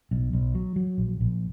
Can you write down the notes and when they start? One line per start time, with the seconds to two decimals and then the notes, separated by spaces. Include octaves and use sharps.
0.11 B1
0.33 B1
0.55 F#3
0.76 F#3
0.98 A#1
1.21 A#1